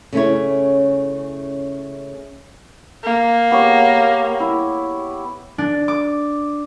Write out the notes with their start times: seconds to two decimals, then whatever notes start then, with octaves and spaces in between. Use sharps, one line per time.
0.13 C#3 A3 C#4 E4 C#5
3.04 A#3
3.51 B3 G4 C#5
4.40 E4
5.58 D4
5.88 D6